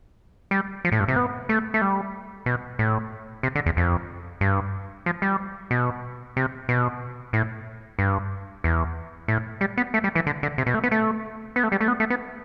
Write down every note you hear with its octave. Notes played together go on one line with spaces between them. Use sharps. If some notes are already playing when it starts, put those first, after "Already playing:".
G3
F3
A2
G2
C3
B3
A3
A3
G3
B2
A2
C3
D3
E2
F2
G2
F3
G3
B2
C3
B2
A2
G2
E2
A2
G3
B3
A3
G3
E3
D3
D3
C3
B2
A3
B3
A3
B3
A3
G3
A3
B3
A3
B3